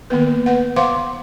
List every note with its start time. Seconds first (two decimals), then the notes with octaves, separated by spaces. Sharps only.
0.10 D#3 A#3 B3 B4
0.46 B4 F#5
0.76 C5 F5 F#5 C6 D6